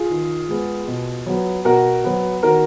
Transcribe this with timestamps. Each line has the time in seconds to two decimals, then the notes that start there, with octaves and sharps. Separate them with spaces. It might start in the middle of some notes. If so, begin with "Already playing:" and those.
Already playing: F4 G#4
0.10 D#3
0.49 G#3 B3
0.87 B2
1.26 F#3 B3
1.65 B2 F#4 A#4
2.04 F#3 B3
2.42 D#3 F#4 A#4